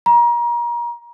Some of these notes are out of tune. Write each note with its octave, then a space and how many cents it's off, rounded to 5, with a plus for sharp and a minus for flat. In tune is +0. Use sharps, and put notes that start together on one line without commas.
A#5 +30